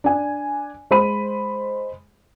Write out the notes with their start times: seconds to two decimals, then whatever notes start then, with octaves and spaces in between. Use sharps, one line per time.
0.04 D4 G#5
0.91 G#3 C5 B5 D#7